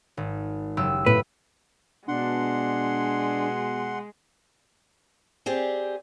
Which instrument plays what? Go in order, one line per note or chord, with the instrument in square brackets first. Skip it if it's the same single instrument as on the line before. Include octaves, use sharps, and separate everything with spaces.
[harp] G#1
F#1 G4 E6
[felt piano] A2 [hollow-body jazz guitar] B4
[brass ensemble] B2 [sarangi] G#3 [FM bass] D4 [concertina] F#5 C6
[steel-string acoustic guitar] C4 G4 G#4 D5